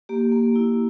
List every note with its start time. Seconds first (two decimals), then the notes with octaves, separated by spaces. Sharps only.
0.09 A#3 G4
0.32 A#3
0.56 E4